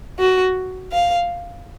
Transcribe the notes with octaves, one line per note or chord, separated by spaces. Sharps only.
F#4
F5